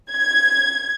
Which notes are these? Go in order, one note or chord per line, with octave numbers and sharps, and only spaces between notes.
G#6